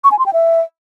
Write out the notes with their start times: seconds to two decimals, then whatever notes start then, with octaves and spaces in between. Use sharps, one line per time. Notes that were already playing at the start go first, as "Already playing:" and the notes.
0.04 C#6
0.11 G#5
0.19 C6
0.26 G5
0.33 E5